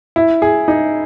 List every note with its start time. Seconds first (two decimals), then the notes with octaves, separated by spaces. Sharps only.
0.16 E4
0.42 G#4
0.68 D#4